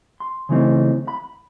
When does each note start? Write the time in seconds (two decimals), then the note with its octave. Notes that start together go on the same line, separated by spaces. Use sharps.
0.20 C6
0.49 C#3 E3 A3 C4 D#4
1.08 B5